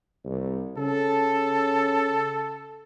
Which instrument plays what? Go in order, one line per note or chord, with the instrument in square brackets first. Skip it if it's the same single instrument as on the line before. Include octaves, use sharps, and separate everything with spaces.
[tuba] C2
[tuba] C#3 [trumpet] A4